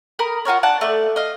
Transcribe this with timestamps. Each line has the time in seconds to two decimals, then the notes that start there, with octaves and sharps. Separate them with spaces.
0.19 A#4 B5 D#6
0.45 F4 F#4 A#4 C#5
0.63 D4 F#5 A5
0.81 A3 D5
1.16 D#5 F5